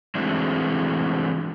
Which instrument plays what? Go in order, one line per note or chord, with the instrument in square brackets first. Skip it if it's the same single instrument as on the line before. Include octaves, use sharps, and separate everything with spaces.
[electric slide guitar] E3 G#3 A3 C4 D4 F#4